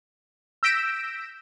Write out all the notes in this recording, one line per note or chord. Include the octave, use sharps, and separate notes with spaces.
E6 G6 A#6 B6 D7 E7